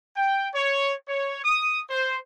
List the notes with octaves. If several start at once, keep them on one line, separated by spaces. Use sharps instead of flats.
G5
C#5
C#5
D#6
C5